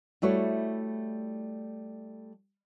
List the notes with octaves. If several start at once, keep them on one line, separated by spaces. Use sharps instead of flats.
G3 A3 E4 F#4 C#5